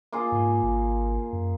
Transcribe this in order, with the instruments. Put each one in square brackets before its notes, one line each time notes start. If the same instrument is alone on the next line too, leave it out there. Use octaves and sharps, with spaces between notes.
[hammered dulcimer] A#3 F4 G#4
[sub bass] G#2
G#1
F#2